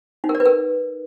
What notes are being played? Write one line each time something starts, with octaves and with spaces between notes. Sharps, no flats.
D#4
A#4
D5
B4
A#4